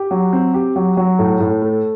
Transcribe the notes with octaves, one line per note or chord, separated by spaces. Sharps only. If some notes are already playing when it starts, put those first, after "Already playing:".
Already playing: G4
F#3
C4
G4
F#3
F#3
A2
A2
A3